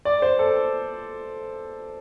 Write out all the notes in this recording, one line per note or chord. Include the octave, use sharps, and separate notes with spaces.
D5
C5
A4